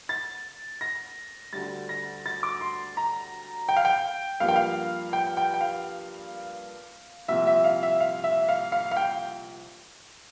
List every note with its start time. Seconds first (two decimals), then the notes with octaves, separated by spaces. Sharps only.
0.09 A6
0.81 A#6
1.53 D2 D3 G3 A6
1.89 A#6
2.26 A6
2.43 D6
2.61 C6
2.97 A#5
3.69 G5
3.76 F5
3.85 G5
4.40 G2 F3 A#3 F5
4.48 G5
4.56 F5
5.13 G5
5.37 G5
5.54 G5
5.61 F5
7.28 C2 A#2 F3 C4 E5
7.47 E5
7.64 F5
7.83 E5
8.00 F5
8.24 E5
8.49 F5
8.72 F5
8.91 F5
8.96 G5